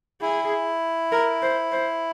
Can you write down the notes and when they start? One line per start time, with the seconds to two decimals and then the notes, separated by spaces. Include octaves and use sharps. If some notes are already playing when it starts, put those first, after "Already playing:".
0.22 E4 G#4
1.12 A#4
1.42 C5
1.72 C5